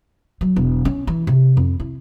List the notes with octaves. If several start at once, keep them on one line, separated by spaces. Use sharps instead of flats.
F#3
E1
C#4
E3
C3
F2
E4